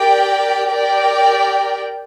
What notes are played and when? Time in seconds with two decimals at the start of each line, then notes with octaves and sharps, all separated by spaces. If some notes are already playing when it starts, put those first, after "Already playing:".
Already playing: G4 A#4 D5 G5
0.68 G4 A#4 D5 G5